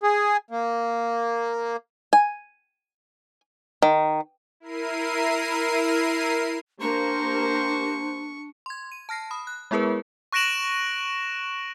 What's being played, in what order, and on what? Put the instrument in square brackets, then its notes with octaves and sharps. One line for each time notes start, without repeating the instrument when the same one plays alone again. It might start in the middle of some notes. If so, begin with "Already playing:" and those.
[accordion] G#4
A#3
[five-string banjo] G#5
D#3
[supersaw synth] E4 A#4 C7 D#7
[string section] A#3 A#4 [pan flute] D4 [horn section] G4 C5 [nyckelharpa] C#6
[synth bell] C6 G#6
D#7
A5 F6 A#6 C7
B5 D#6
F#6
G#3 B3 E4 G#4 A#4 B4
[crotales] C#6 F#6 A#6 D7 E7 F#7